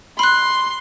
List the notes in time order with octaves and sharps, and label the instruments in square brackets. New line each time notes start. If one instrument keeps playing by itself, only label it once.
[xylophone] B5 F#6 [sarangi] C6